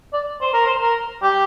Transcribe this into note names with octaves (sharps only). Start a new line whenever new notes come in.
D5
C5
A#4
C5
A#4
G4